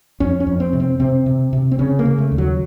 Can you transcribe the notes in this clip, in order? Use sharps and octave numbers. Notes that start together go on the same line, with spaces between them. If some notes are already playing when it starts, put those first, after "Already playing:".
F2 C#4
C#4
F2
C4
C3
C4
C3 C4
C3
C3
C4
C#3 C#4
A#3
C#3
A3
D#2
F#3